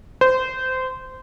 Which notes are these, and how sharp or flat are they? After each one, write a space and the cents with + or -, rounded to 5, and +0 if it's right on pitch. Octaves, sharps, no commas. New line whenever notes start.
C5 -20